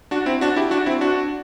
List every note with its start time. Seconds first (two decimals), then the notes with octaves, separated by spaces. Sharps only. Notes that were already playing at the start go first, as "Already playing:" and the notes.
0.11 D4 F#4
0.26 C4 E4
0.41 D4 F#4
0.56 E4 G4
0.71 D4 F#4
0.86 C4 E4
1.01 D4 F#4